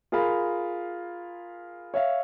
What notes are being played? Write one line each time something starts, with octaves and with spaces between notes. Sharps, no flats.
F4 G#4 A#4 F5 B5
C#5 E5 F5